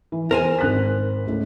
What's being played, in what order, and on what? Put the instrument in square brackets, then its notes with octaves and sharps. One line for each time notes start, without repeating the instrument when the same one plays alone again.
[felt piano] E3
[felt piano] E2 [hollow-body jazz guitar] A#4 C5 G#5
[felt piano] G#1 F#6 B6
C#2 A2